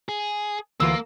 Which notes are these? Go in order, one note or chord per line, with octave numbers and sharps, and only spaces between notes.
G#4
D2 E3 A#3 F4 E6